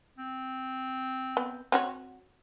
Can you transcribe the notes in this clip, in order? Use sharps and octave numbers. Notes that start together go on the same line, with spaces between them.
C4
B3
C4 F#4 C#5